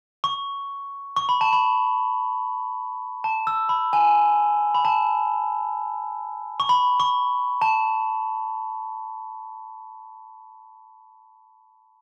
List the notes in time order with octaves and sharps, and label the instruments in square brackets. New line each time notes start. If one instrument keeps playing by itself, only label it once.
[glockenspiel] C#6
C#6
B5
A5
B5
A5
E6
B5
G#5
B5
A5
C#6
B5
C#6
A5